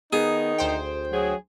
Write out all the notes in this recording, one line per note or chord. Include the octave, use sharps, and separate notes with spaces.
D#3 B3 D#4 G#4
D2 C5 G5
F#3 G#4